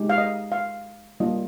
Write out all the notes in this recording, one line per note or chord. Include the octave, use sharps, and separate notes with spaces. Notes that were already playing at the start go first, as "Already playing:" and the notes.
Already playing: G#3 D#4 G4
F5
D#5
F5
G3 A#3 D4 F4 D#5